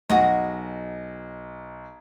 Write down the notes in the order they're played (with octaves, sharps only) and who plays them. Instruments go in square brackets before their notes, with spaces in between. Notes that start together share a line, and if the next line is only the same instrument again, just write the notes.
[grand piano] B1 [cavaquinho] F#4 G#4 D#5